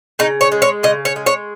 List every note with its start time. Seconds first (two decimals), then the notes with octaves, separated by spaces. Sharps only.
0.19 C#3 D#4
0.41 C#5
0.52 G#3
0.62 C#5
0.83 C#3 D#5
1.05 C#5
1.16 G#3
1.26 C#5